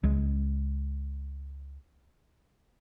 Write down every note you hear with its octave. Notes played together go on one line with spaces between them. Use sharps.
C#2 G#3